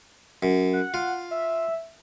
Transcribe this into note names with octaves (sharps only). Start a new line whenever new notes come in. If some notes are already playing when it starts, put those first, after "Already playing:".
F#2
F#5
F4
E5